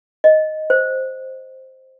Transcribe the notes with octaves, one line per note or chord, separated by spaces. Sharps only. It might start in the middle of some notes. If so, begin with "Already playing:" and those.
D#5
C5